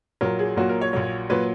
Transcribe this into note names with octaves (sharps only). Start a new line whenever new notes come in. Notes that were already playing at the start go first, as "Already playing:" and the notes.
A#1 A#2 F#3 A#4
G#4
A#1 A#2 F#3 F#4
A#4
C#5
A#1 A#2 F#3
A#2 F#3 B4